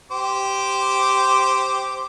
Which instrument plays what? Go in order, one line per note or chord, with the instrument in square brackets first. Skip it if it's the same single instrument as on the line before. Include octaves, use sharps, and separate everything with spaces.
[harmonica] G4 C5 D6